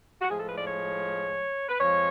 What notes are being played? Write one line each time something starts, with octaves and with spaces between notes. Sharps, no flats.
F#4
A2 F3 G#3 G#4
A4
B4
D5
C#5
B4
F2 F3 G#3 C#5